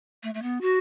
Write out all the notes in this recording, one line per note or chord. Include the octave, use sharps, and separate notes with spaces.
A3
A3
B3
F#4